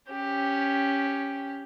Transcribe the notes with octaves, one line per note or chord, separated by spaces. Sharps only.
C#4 G4